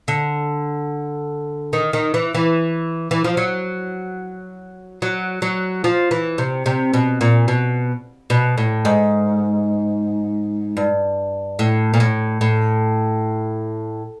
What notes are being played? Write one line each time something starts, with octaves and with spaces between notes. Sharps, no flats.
D3
D#3
D#3
E3
E3
E3
F3
F#3
F#3
F#3
F3
E3
C3
C3
B2
A#2
B2
B2
A2
G#2
G2
A2
A#2
A2
A2